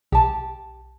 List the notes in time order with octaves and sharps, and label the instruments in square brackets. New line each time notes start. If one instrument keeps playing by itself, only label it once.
[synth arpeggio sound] B1 [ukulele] G4 A5